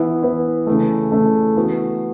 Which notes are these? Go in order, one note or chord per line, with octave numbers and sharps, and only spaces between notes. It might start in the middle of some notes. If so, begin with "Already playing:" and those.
Already playing: E3 B3 E4
E3 B3 E4
C#3 E3 A3
C#3 E3 A3
E3 B3 F#4